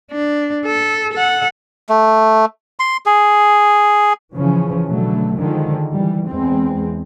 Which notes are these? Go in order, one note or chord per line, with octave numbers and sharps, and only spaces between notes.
D4
A4
A4 F#5
A3
C6
G#4
C#3 E3 F3 C#4
B2 D3 F#3 A3
D3 D#3 F3 G#3
E3 G3
E2 G#3 C4